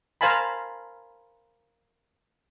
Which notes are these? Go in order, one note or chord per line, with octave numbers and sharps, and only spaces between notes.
A#4 C5 F5 G#5 A5 B5